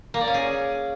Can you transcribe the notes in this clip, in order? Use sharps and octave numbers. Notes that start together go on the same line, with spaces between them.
A#3
D5
C#4
G#4